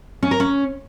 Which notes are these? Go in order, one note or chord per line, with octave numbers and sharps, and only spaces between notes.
C#4
A#4
C#4